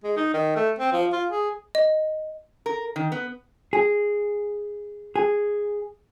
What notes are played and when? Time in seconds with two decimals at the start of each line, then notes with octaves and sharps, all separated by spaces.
0.04 G#3
0.17 D#4
0.34 D#3
0.56 A3
0.79 C4
0.93 F3
1.13 F4
1.29 G#4
1.75 D#5
2.66 A#4
2.96 D#3
3.12 B3
3.73 G#4
5.16 G#4